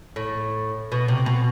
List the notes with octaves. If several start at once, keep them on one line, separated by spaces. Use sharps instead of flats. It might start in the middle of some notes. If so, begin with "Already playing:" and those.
A2
B2
C3
B2